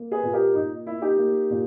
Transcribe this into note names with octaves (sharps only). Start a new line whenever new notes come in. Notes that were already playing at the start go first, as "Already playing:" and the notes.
Already playing: A#3
G#4 B4
A#2
G4 A#4
A#2 D#4
A#3 E4
D#4 G4
A#3
A#2